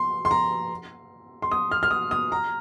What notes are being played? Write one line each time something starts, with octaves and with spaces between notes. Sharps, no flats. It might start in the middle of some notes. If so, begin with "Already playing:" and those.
Already playing: C6
C6
A#5
C6
D#6
F6
F6
D#6
D#6
A#5